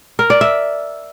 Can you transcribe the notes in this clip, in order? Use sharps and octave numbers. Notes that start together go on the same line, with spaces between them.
A#4
D5
E5